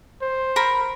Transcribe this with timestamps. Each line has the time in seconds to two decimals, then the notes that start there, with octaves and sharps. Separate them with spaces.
0.22 C5
0.56 A#4 B5